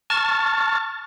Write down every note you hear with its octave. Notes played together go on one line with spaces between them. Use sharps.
A5 C#6 F6 A6